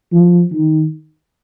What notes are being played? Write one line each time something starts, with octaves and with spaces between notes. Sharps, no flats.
F3
D#3